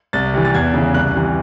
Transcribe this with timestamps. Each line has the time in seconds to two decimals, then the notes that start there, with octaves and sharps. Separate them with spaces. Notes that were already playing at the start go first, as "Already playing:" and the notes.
0.13 C2 A6
0.34 C3 E3
0.45 A6
0.54 E2 G#6
0.74 C#3 E3
0.94 C2 F#6
1.15 C3 E3